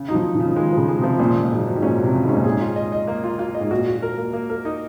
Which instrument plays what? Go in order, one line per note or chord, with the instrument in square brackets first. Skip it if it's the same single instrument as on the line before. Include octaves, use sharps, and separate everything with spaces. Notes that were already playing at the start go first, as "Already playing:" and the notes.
Already playing: [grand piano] C#3
[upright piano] F#3 [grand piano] D#4
[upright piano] F3
[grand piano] D#4
[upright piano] F3
[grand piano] C#3
[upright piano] F3
[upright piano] D#3 [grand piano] G#3
[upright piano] C#3 [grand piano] F3
[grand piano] G#3
[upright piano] C3
[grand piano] F3
[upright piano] A#2 [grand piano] C#3
[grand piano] C#3
[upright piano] A#2
[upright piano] G#2 [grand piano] F#3
[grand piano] F#3
[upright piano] G#2
[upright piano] A#2 [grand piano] C#4
[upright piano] C3 [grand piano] F#3
[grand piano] C#3
[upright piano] G#2
[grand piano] C#4
[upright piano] A#2
[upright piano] G#2 [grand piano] G#4
[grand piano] F4
D#5
D#5
A#3
F4
F4
D#5
[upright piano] G#2
[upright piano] A#2 [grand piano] F#4
[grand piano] F#4
A#4
A#3
A#3
A#4
D#4